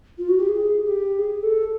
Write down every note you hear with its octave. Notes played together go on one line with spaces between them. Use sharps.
F4
F#4
G4
G#4
G4
G#4
A4